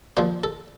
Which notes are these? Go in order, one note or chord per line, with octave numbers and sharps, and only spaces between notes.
A#2 F3 C5
A4